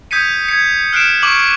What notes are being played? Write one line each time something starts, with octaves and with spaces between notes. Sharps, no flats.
D#6 G6 G#6 B6 C#7 D#7
G#6 C#7
F6 F#6 C7 D7 E7
C#6 D6 F#7